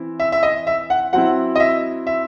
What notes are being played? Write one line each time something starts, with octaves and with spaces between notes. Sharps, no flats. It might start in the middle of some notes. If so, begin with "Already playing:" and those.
Already playing: E3 C4 E4
E5
E5
D#5
E5
F#5
F#3 C4 E4 F#5
D#5
E5
E5